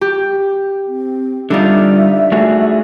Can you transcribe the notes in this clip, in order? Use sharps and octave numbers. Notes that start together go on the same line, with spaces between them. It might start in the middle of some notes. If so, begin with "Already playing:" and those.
G4
C4
D3 G3 D4 D#4 F4 E5
A3 F#4 G#4